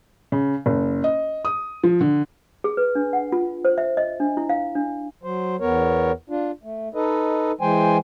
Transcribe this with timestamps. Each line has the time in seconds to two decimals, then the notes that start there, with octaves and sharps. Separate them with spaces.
0.32 C#3
0.66 F#1
1.04 D#5
1.45 D#6
1.84 F3
2.01 D3
2.64 G#4
2.77 B4
2.95 D4
3.13 F#5
3.32 F4
3.65 C5
3.78 E5
3.97 D#5
4.20 D4
4.37 E4
4.49 F5
4.75 D4
5.23 F#3 C5
5.60 E2 B3 A#4 C#5
6.30 D4 F4
6.63 A3
6.95 D#4 A4 B4 D#5
7.61 E3 G#3 C5 G5 G#5